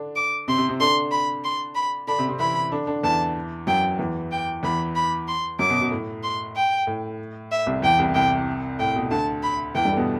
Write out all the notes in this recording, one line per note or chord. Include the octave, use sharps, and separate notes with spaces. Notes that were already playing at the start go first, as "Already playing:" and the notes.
Already playing: D3 D4
D6
C3 C4 C6
C3 C4
C3 C4
D3 D4 C6
B5
C6
B5
D3 D4 B5
C3 C4
C3 C4
E3 E4 B5
D3 D4
D3 D4
E2 E3 A5
F#2 F#3 G5
E2 E3
G5
E2 E3 B5
B5
C6
F#2 F#3 D6
B2
B2
A2
C6
G5
A2
E5
C2 C3
E2 E3 G5
C2 C3
C2 C3 G5
A2 G5
B2
D2 D3 A5
B5
E2 E3 G5
G2 G3
A3
B2 B3